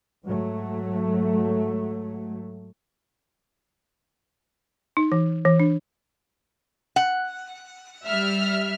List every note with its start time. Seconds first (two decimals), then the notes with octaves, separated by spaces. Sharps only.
0.25 G#2 F#3 A3
4.97 D#4
5.12 E3
5.45 E3
5.60 D4
6.96 F#5
8.06 G3 E5 F6